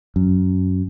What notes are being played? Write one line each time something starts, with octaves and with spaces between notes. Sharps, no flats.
F#2